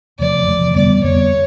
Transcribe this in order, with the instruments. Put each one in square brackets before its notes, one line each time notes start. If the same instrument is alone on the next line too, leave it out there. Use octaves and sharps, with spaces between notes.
[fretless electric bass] E2 C3 F3 A3 [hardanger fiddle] D5
[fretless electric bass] E2 C3 F3 A3
[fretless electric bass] F2 D3 G3 B3 [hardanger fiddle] D5
[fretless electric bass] F2 D3 G3 B3 [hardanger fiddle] C#5